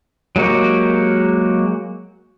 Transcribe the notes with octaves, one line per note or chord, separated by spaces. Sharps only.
F#3 G#3 A#3 F#4 G4